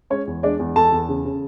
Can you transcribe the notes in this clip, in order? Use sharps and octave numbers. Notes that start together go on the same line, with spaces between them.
G#3 C#4 C#5
E2
G#3 D4 D5
E2
E2 A4 A5
E2
C#3
C#3